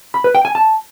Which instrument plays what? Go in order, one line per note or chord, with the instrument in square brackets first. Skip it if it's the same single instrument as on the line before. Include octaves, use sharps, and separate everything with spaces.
[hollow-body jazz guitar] B5
B4
G5
G#5
A5